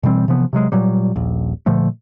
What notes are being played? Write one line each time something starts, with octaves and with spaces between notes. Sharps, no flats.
B2 E3 G3 C4
C3 E3 F3 B3
C3 F#3 G#3
A#2 F#3 G3
D#1 A#1
A#2 D3 F3 A3